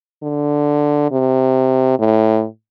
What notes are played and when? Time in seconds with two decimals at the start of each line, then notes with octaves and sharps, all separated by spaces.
0.23 D3
1.11 C3
1.99 A2